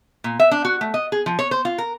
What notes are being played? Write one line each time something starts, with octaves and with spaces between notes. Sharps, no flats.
A#2
E5
D4
F#4
A3
D#5
G#4
F3
C#5
C5
F4
A#4